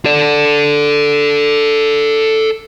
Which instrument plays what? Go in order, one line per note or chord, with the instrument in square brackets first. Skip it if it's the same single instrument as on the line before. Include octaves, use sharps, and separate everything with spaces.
[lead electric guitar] A4 D5